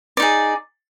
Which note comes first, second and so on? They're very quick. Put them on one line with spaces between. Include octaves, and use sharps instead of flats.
D5 D#4 G#4